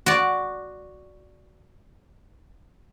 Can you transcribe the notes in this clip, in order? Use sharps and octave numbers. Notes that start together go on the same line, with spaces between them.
F#4 D5